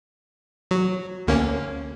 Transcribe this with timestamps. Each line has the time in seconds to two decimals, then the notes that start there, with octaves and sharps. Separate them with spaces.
0.71 F#3
1.27 D2 A#3 C#4